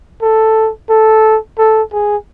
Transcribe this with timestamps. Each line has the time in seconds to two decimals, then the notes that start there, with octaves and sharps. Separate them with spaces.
0.22 A4
0.90 A4
1.58 A4
1.93 G#4